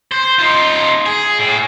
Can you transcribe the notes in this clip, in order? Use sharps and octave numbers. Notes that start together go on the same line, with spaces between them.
C5
D#4 F4
G#4
A2